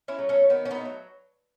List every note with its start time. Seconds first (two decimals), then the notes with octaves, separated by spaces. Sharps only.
0.08 C#4 E4
0.18 F#3 A3
0.29 A3 C#4
0.50 D#3 B3
0.66 C#4
0.71 B3 D#4
0.81 F#3 A3